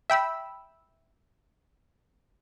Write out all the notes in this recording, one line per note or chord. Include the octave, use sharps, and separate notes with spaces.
E5 G5 B5 E6